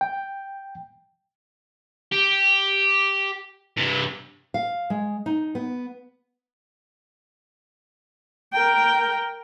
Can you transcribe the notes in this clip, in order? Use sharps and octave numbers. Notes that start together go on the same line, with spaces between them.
G5
G4
G2 C3
F5
G#3
D#4
B3
A#4 G5